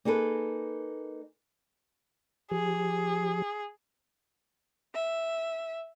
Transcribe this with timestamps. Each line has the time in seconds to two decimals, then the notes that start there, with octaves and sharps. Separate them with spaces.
0.05 A#3 D#4 G#4 A4 B4
2.51 F3 G4 G#4
4.95 E5